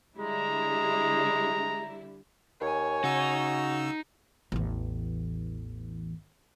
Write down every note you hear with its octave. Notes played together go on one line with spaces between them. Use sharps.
D3 G3 G#3 E4 A#5
D#2 C#5 G#5
C#3 D#4 F#4 E6
A1 E2